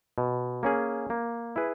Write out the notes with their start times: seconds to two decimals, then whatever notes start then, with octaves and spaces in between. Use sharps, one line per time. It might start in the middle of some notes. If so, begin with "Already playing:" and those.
0.18 B2
0.63 A#3 C#4 G#4
1.10 A#3
1.56 E4 G#4 B4